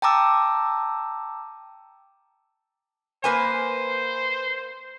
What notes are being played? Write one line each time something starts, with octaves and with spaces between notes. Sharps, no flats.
G5 A5 A#5 D6 E6
A#3 B4 C5 G#5